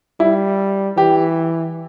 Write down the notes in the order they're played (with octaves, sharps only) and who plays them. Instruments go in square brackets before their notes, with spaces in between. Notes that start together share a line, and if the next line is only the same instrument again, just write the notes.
[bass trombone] G3 [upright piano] E4
[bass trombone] E3 [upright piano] G4